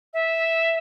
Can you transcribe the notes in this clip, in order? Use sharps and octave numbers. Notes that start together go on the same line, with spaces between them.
E5